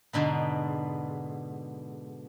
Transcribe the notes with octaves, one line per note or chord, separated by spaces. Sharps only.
G#2 B2 D3 B3